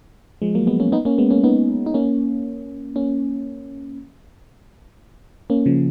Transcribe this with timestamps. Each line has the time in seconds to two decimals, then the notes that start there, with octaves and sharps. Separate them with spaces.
0.42 F3 G#3
0.55 F#3 A#3
0.67 G#3 B3
0.80 A#3 C#4
0.92 B3 D#4
1.05 A#3 C#4
1.18 G#3 B3
1.30 A#3 C#4
1.43 B3 D#4
1.86 D#4
1.94 A#3 C#4
2.96 A#3 C#4
5.50 A#3 C#4
5.66 C#3 F3